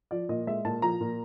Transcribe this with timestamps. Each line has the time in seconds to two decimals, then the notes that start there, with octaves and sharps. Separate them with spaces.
0.11 F3 D5
0.29 A#2 D#5
0.47 G#3 E5
0.65 A#2 A5
0.82 F3 A#5
1.01 A#2